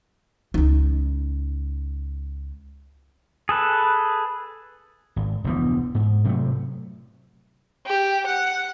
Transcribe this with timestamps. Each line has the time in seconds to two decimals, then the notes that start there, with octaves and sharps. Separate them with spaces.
0.54 C#2 D#4
3.49 G#4 A4 B4
5.16 G#1
5.44 F1 D2 E3 B3
5.95 G#2
6.24 C3 F#3 G#3 A3
7.87 G4
8.27 F#5